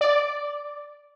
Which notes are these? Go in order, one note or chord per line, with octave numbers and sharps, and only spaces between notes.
D5